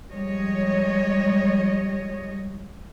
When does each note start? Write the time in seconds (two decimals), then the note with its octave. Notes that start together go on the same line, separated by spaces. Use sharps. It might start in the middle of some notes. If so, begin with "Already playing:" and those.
0.11 F3 G3 G#3 C#5 D#5